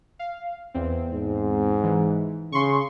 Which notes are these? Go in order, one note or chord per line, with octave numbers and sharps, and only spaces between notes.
F5
E2 C4
G#2
E3
C#3 C6 C#6